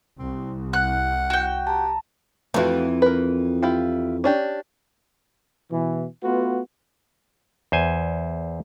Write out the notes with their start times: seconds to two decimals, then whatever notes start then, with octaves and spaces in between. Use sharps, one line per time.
0.19 C2 C4
0.73 F#5 F#6
1.30 F#4 G5
1.67 G4 A5 A#5
2.54 F2 E3 A3 F4 F#4
3.02 A#4 B4
3.63 E4 F4 G4
4.24 C#4 D4 G4
5.72 B2 E3
6.23 A3 B3 F4 F#4 B4
7.72 E2 C5 G#5